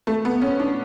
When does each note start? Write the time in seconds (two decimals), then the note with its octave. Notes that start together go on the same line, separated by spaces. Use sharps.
0.07 A3
0.25 B3
0.42 C#4
0.60 D4